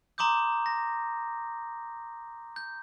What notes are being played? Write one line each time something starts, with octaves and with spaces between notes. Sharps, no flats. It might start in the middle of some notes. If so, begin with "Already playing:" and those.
A#5 C6 D6 D#6 G6
A#6
G6